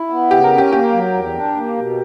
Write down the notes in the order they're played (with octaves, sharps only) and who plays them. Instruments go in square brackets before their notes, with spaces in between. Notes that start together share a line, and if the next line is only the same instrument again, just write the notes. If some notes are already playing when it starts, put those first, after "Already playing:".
Already playing: [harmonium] E4
B3
[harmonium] C#3 [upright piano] G4
[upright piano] A#4
[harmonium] C#4
[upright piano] G4
[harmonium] A#3 [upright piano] G4
[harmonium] F#3
E2
D4
A#3
B2